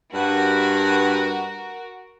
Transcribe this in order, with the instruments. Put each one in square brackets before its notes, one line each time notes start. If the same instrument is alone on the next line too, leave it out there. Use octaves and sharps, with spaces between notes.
[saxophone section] G2 B4 [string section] F#4 A#4